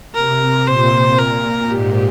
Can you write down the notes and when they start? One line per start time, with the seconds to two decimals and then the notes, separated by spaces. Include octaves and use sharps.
0.15 C3 A#4
0.66 A#2 C5
1.18 A#4
1.70 G#2 G4